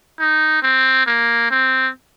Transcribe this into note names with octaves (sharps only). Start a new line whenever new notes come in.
D#4
C4
A#3
C4